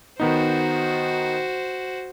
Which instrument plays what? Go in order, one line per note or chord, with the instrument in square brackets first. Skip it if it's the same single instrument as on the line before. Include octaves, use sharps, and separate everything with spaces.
[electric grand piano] D#3 B3 D#4 [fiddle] F#4 C5